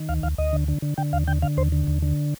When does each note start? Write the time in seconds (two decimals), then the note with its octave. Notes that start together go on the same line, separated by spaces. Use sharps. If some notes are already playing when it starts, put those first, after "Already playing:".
Already playing: D#3
0.09 D2 F5
0.23 D2 F5
0.38 D2 D#5
0.53 D3
0.68 D3
0.82 D3
0.97 D3 G5
1.13 D#2 F5
1.27 D3 G5
1.42 D3 F5
1.57 D#2 C5
1.72 D3
1.87 D#2
2.02 D3